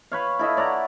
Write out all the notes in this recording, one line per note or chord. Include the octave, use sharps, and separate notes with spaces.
B4 C#5 F5
E4 A4 D#5 E5
C#5 D5 F#5 A#5